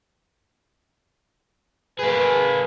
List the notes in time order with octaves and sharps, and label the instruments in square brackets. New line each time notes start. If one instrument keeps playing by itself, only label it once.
[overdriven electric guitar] A#3 G#4 [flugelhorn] B4